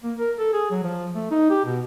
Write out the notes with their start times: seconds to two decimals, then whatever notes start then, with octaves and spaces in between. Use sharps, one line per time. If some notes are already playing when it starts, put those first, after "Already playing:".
0.04 A#3
0.18 A#4
0.39 A4
0.53 G#4
0.71 F#3
0.83 F3
1.15 A3
1.31 D#4
1.50 G4
1.65 B2